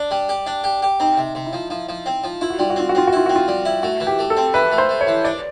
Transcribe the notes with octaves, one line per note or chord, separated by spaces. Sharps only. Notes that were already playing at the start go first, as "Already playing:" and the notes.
Already playing: D4
G3
G4
D4
G4
G4
C4 D#4
C3
C3
E4
F3
F3 E4
F3
C4
F3
E4 F4
F#4
G3 F4
F#4
C4 F4
F#4
C4 F4
F#4
E4 F4
C4 F#4
F4
G3
E4
A3 F#4
E3
G4
A3
A4
C4
E3 B4
A3
C5
A3
C#5
E3
D4 D5